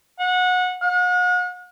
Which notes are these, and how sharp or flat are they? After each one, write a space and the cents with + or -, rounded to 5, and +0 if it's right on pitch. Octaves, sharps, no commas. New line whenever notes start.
F#5 -25
F#5 -40